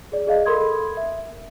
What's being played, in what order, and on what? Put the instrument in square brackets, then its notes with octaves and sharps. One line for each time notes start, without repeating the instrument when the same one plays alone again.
[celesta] G#4 D5
G#4 D#5 F5
A4 A#4 B5 C6 D#6 G#6
E5